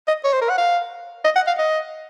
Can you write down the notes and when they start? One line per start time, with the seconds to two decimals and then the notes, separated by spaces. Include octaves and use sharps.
0.08 D#5
0.25 C#5
0.33 C5
0.42 A#4
0.50 F#5
0.58 F5
1.25 D#5
1.36 F#5
1.47 F5
1.59 D#5